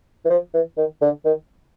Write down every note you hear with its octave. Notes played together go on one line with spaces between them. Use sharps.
E3
F3
E3
D#3
D3
D#3